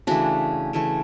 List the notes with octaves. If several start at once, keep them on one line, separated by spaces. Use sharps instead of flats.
C#3 E3 A3 D4 F#4
C#3 E3 A3